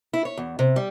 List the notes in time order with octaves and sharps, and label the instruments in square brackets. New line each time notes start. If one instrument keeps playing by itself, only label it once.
[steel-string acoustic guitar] E4
C#5
E2
C3
G3